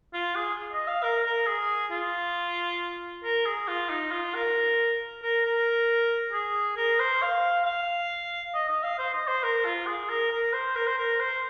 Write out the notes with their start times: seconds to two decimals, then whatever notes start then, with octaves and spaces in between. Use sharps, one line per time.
0.14 F4
0.36 G#4
0.73 D#5
0.88 F5
1.03 A#4
1.25 A#4
1.46 G#4
1.91 F4
3.23 A#4
3.46 G#4
3.68 F4
3.90 D#4
4.11 F4
4.35 A#4
5.22 A#4
5.45 A#4
6.33 G#4
6.77 A#4
7.00 C5
7.22 F5
7.65 F5
8.54 D#5
8.68 D#5
8.83 F5
8.99 C5
9.13 D#5
9.28 C5
9.43 A#4
9.65 F4
9.86 G#4
10.09 A#4
10.31 A#4
10.53 C5
10.76 A#4
10.87 C5
10.98 A#4
11.20 C5